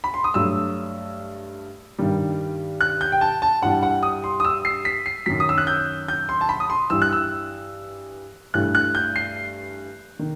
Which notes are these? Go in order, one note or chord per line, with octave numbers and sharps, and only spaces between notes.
B5
C6
D#6
G2 F#3 A3 E6
G2 D#3 G3
F#6
G6
G5
A5
A5
G2 E3 G3 F#5
F#5
D#6
C6
D#6
E6
C7
B6
C7
F#2 D#3 F#3 B6
D#6
E6
F#6
G6
G6
C6
A5
B5
D#6
C6
G2 E3 G3 E6
F#6
E6
G2 E3 A3 F#6
F#6
G6
C7
D#3